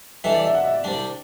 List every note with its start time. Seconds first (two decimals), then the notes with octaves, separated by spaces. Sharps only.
0.24 E3 G3 D4 A4 E5
0.34 D5
0.44 E5
0.54 F#5
0.64 E5
0.74 D5
0.84 C2 C3 G3 D4